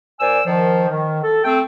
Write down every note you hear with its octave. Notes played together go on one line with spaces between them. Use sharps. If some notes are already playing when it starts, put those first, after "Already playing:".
A#2 C5 D5 G#5 E6
D#3 F3
D#3
A4
A3 C4 A4 G5